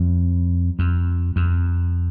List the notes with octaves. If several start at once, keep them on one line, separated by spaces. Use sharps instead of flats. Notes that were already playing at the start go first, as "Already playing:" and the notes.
Already playing: F2
F2
F2